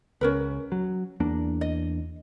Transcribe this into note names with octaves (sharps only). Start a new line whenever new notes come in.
C#2 C#4 A#4 B4
F#3
E2 A#3 D4
D#5